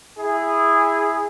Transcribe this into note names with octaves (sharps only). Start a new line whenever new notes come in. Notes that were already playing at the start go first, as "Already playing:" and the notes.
E4 G#4